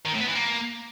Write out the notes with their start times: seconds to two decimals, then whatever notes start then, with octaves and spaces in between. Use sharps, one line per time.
0.05 D#3
0.13 A2
0.20 B3
0.28 E3
0.35 A#3